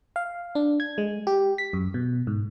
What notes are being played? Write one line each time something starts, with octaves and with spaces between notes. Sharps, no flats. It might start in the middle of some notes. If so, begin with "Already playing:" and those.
F5
D4
G#6
G#3
G4
B6
F#2
B2
G#2